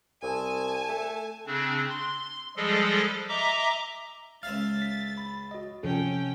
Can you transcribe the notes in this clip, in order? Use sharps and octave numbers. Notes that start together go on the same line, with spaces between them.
C2 G#5 A5
A3
C#3 C4 D4
C6
F3 G3 G#3 G#4 A4 D#5
D#5 E5 A#5 D6
C#2 E5 F5 F6 A6
B6
B5
F#4 D#5
C3 F3 C#4 A4 G5